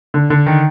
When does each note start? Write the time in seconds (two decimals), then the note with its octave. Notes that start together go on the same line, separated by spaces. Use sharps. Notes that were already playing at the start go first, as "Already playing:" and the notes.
0.14 D3
0.30 D3
0.46 D#3